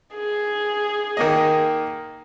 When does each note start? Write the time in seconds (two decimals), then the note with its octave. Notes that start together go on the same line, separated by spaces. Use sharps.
0.16 G#4
1.17 D#3 A#3 D#5